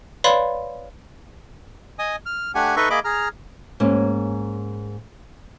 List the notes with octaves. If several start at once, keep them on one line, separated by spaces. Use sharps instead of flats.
B4 C#5 D5 F5 B5 C6
D#5 G#5 D#6
F6
A3 D4 G4 F#5 G#5
D#4 A4 B4 D#5 E5 C#6
A#3 G#4 D#5 E5 B5 D6
G#4 A#5 F6
G#2 A#3 C#4